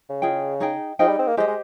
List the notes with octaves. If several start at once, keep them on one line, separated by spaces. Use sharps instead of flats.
C#3
F4 G#4 D#5 G5
D#4 G#4 D#5 G5
F3 D#4 G#4 D#5 G5
G3
C4
A#3
G#3 G4 C5 D#5
G#3